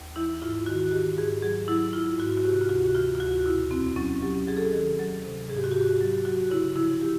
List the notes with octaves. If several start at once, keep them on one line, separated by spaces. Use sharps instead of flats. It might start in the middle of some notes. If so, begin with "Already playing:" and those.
Already playing: D#2
E3 E4
G#2 F4
D#3 F#4
D#3 G4
G#2 G#4
F#3 G#4
F#3 E4
F#3 F4
G#2 F#4
F#4
C3 G4
F4
D2 F#4
E3 F4
F4
D2 F#4
B2 E4
E2 C4
F#3 C#4
F#3 G4
F#3 G#4
A4
G#4
D#3
F#3
C3
G#2 G#4
G4
F#4
G#2 G4
F#3
F#3 F#4
C#3 E4
F3 E4
G4